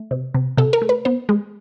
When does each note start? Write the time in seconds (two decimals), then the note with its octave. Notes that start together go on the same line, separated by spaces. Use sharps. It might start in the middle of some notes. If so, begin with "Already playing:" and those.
Already playing: A3
0.11 C3
0.34 C3
0.57 C3 A4
0.73 A#4
0.82 A3
0.89 B4
1.05 B3 C5
1.29 G#3